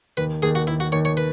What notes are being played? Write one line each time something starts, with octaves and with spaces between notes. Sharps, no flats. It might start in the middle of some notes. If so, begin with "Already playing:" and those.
D#2 B4
D#2 G#4
F#4
D#2 E4
F#4
D#2 C#5
C#5
B4